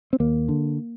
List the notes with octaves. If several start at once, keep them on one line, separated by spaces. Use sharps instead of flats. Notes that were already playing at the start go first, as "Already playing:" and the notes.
C4
D#2 A#3
D3